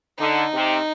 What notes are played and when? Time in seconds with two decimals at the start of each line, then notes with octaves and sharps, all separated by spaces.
0.18 D3 D#4
0.53 C3